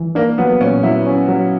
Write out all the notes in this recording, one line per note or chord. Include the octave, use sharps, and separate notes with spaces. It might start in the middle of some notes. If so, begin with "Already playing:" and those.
Already playing: E3
A#3 D4
F#3 B3
A#2 C#4
F#3 E4
C#4
F#3